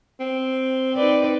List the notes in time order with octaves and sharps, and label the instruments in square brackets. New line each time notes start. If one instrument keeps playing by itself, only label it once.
[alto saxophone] C4
[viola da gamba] D#4 B4 D5